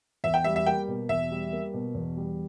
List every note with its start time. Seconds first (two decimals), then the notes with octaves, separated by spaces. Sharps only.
0.24 E2 E5
0.34 G5
0.44 G3 E5
0.56 E5
0.66 A#3 G5
0.88 B2
1.09 E2 E5
1.31 G3
1.53 A#3
1.74 B2
1.95 E2
2.17 G3